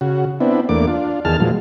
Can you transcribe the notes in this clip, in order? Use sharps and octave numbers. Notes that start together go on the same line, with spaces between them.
C#3 F#4
B3 C4 D4 E4
E2 A3 A#3 D4 D6
D4 F4
E2 D#3 G#4 A5 F6
A#2 F3 F#3 G#3